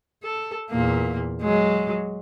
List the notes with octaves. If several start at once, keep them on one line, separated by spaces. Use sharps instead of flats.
A4
E2 A#2 A#3
F#3 G#3